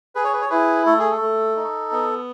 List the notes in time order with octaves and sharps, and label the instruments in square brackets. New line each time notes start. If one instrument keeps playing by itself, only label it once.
[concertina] G#4 B4
C#5
B4
C#5
E4 G#4 B4
A3 A4
G#4
A4
A3
D#4
B3